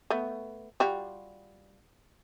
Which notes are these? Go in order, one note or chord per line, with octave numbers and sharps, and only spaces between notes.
A3 B3
G3 F4 F#4